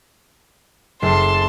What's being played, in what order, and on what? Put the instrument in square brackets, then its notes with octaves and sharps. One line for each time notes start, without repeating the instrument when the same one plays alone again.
[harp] F#1 A3 C7 [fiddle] A5 C6